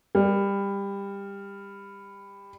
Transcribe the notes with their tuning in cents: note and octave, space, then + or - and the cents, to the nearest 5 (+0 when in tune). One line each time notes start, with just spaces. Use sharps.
G3 +20